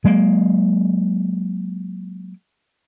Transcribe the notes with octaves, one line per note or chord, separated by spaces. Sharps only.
F#3 G#3 A#3